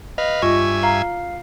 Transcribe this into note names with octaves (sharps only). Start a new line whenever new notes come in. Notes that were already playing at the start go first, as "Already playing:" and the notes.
B4 D#5 F5
G2 F4 E5 G#5 C#6
F5 A#5